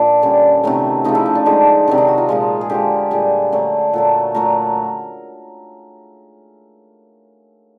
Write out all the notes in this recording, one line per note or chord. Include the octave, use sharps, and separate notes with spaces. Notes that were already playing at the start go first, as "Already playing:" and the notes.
Already playing: A#2 D4
D3 G3 C#4
C3 D#3 F#3 A3
C#3 F3 A3 D#4
E4
D#4
D4
D3 F3 G#3 D#4
C3 D#3 F#3 D4
D#4
F#4
F4
A#2 F3 G#3
G#4
D3 F3 G#3 G4
A#2 G3 G#4
D3 F#3 A3
A#2 F#3 A3 A4
A#2 F#3 A3 A#4